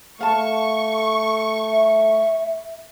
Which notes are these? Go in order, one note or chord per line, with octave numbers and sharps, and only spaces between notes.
A3 F5 A5 C#6
E5